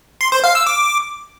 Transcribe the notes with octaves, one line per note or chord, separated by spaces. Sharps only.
C6
C5
F5
E6
D6